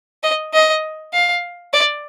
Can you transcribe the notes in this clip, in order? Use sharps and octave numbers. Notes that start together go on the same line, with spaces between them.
D#5
D#5
F5
D5